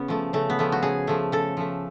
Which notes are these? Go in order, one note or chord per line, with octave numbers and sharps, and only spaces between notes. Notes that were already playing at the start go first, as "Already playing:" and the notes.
Already playing: C#3 B3 C#4
F3 A3
C#3 A3
B3
F3 A3
F#4
C#3 G#4
F3 A3
C#3 A4
F3 A3